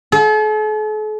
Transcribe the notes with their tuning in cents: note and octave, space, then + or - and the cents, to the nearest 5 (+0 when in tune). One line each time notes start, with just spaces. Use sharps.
A4 -45